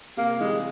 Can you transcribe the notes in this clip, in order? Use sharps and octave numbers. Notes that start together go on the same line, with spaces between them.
C3 A#3
E3 G3 G#3